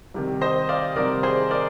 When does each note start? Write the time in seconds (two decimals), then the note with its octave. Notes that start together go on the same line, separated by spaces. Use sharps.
0.14 C2 C3 D#3
0.41 C5 D#5
0.69 D5 F5
0.96 C2 C3 D#3 A#4 D5
1.23 G#4 C5
1.51 A#4 D5